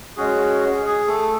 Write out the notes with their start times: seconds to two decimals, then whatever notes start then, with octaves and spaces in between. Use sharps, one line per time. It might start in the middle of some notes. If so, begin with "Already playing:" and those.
0.17 G#3 C#4 F#4 G#4
0.85 G#4
1.07 A3 A4